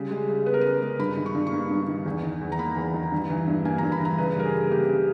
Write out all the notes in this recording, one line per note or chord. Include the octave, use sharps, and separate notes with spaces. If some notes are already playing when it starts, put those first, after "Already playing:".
Already playing: C#3 G3
G#3
C#3
B3 B4
A#4
B4
C#3
G#3
G2 B5
D#3
C#6
G2
C#6
A#3
G2
D#3
E2
D#3
E2
A#5
A#3 B5
E2
D#3
G2
E3
G2
A#3 G#5
A#5
G2
B5
E3 A#5
C#3 B4
G3 A#4
G#4
C#3
A#3 G4
C#3